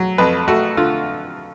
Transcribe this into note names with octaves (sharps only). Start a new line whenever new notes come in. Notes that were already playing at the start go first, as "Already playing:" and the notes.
Already playing: F#3
F2 B4
A3 F#4
D3 F4